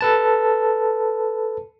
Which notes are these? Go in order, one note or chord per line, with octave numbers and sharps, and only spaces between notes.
A4 B4 A5